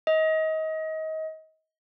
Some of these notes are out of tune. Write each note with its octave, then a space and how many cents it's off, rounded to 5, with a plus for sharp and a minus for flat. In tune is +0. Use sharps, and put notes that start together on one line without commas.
D#5 +30